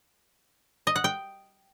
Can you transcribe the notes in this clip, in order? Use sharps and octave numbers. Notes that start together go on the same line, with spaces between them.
D#5
F#5
G5